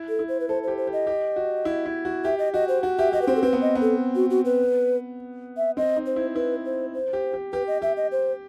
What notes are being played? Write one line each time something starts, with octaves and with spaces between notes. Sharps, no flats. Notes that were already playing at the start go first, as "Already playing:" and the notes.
Already playing: E4
A4
E4
C5
B4
A4 C5
G4 C5
C5
G4
D#5
G4
F#4
E4
E4
F#4
G4 E5
D#5
F#4 D#5
C5
F#4
G4 E5
G4 D#5
B4
C4 C5
A4
C4 B4
B3
D#5
B3
A4
F#4
F#4
B4
E5
C4 D#5
D#4
C5
E4
E4 B4
C5
C5
G4
G4
G4 B4
D#5
G4 E5
D#5
C5